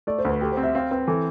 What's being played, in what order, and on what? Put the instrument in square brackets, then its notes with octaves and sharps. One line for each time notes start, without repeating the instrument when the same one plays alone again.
[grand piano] A3 [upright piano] D5
[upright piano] C5
[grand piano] D2 [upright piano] B4
[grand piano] G4 [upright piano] A4
[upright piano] C5
[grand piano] C4
[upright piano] E5
[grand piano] C4 [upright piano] F5
[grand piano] C4 [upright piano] B4
[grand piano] E3 [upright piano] A4